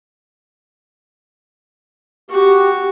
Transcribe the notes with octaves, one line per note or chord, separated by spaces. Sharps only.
F#4 G4